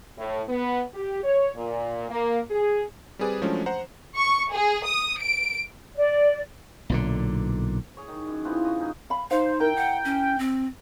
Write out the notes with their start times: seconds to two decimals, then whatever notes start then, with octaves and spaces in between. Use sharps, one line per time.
0.18 A2
0.49 B3
0.93 G4
1.23 C#5
1.56 A#2
2.09 A#3
2.51 G#4
3.19 G3 C4 G#4 B4 D5
3.42 F3 F#3 G#3 A3 C#4 D4
3.66 C5 F#5 A#5
4.16 C#6
4.52 G#4
4.85 D#6
5.19 D7
5.95 D5
6.89 B1 A#2 D3
7.97 G#4 C#5
8.08 D#3
8.27 F#2
8.44 E3 F3 B3 C4
8.65 D#5 C#6
8.80 G#2 D#4 G#4
9.10 F5 B5
9.31 D#4 C5 F5
9.60 E4 A#4 G5 A#5
9.76 F#5
10.05 C#4
10.38 C4